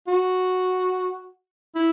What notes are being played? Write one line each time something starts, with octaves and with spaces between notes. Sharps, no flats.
F#4
E4